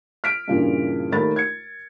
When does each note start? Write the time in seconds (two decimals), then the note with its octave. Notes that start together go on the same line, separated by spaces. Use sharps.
0.24 F6 B6 D7
0.48 G2 A#2 C#3 E3
1.12 D#2 A3 D#4 B5 A6
1.36 G#6 C#7